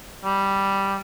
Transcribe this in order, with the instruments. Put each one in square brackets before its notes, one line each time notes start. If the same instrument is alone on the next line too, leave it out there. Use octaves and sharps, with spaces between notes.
[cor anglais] G3